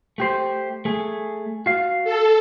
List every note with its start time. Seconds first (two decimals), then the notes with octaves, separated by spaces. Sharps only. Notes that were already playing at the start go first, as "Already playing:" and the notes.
0.18 A3 G4 C5
0.85 A3 G#4
1.66 F#4 F5
2.04 A4